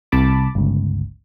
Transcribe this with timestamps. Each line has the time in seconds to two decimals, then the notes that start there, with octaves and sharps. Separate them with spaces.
0.12 C2 A5 B5 D6
0.55 G1 C#2